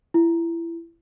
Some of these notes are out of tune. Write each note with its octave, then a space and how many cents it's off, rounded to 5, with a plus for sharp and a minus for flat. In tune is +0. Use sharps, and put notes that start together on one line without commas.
E4 +25